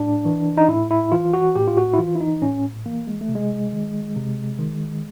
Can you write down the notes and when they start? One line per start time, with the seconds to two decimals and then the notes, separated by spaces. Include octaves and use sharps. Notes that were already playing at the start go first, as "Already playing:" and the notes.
Already playing: A2 D4
0.25 E3
0.57 D#4
0.69 A2 E4
0.91 E4
1.12 E3 F4
1.33 F#4
1.55 A2 G4
1.68 F4
1.77 F#4
1.93 E4
1.99 E3 F4
2.15 E4
2.21 D#4
2.42 A2 C#4
2.86 E3 A#3
3.07 G#3
3.21 A3
3.29 C3
3.35 G#3
3.73 D#3
4.16 C3
4.59 D#3